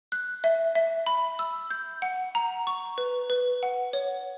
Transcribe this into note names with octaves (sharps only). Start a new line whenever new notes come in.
F#6
E5
E5
B5
E6
G6
F#5
A#5
C#6
B4
B4
F#5
C#5